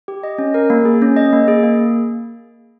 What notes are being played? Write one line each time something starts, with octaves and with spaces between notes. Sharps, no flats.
G4
D#5
C#4
A#4
A#3
G#4
C#4
D#5
A#3
G#4
A#3